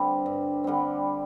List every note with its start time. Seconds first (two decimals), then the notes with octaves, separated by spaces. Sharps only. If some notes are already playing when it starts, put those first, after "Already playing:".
Already playing: G2 D3 G3 C4
0.26 G2
0.64 D3 G3 C4